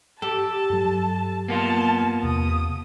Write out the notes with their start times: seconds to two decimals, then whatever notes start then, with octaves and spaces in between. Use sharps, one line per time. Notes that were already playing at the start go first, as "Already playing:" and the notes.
0.22 G4 A4 A5
0.70 G2 F#3
1.48 A#3 B3 F4 A5
2.23 E2 C3 D#6